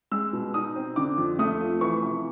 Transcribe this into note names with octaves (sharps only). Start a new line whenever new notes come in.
G#3 E6
B2
D#4 D#6
C4
D3 D6
F2
A3 D#6
F3
E3 C#6
C3